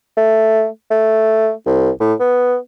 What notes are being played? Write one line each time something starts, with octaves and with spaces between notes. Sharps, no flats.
A3
A3
C2
A2
B3